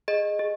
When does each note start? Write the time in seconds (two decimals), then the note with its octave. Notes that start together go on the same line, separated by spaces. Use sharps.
0.08 G#4 D#5
0.39 G#4